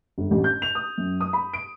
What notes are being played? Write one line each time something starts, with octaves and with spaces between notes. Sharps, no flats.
G1
A1
G6
F7
D#6
F#2
D#6
B5
D7